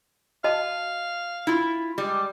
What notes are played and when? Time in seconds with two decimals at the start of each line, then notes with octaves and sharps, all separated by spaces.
0.44 F#4 D#5 F5 A5
1.47 E4 F4
1.98 G3 G#3